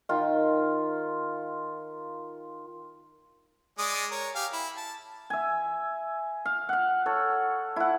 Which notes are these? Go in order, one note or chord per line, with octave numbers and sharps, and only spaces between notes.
D#3 F4
G#3 D5 D#6
A#4 C#5
G4 F5 G#5
E4
A5
E5 G#5
F5
F5 F#5
A4 C#5
E4 F#5